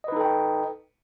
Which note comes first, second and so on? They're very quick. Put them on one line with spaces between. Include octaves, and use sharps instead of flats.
D#5 B4 D#4 A4 G5